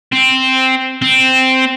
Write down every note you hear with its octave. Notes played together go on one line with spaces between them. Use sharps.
C4
C4